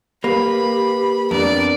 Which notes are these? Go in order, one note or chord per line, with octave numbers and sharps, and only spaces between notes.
A#3 G4 B4 B5
F2 B3 D4 A#4 D5